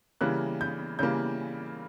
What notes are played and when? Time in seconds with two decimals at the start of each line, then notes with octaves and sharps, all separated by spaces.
0.21 C#3 E3 G3 A#3 F#6
0.61 G6
0.99 C#3 E3 G3 A#3 G6